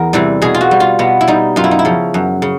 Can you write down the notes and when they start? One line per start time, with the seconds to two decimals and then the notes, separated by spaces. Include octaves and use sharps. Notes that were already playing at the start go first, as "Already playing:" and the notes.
Already playing: E2 A#4
0.13 C3 E3 G3
0.42 B2 G#4
0.55 F4
0.61 F#4
0.71 G3
0.80 F4
0.99 B2 B3
1.21 E4
1.28 G3 D#4
1.56 F#2 F4
1.64 E4
1.71 D#4
1.79 E4
1.85 C#3 F3
2.14 F#2
2.42 C#3